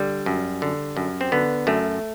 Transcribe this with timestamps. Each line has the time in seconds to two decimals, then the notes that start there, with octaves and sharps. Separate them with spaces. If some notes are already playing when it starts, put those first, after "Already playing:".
Already playing: D3 G3
0.26 F#2
0.62 D3
0.97 F#2
1.21 C4
1.32 D3 B3
1.67 F#2 A3